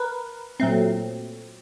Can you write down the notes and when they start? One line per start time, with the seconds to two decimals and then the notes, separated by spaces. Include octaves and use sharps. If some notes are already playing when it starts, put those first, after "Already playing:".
Already playing: A#4 B4
0.60 A#2 F#3 A3 C4